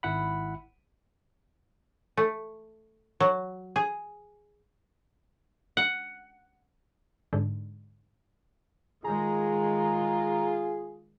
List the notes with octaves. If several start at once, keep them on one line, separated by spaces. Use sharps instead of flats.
G#1 E4 F#5 B5
A3
F#3
G#4
F#5
G#2 D3
D#3 G#3 F4 G#4 A#5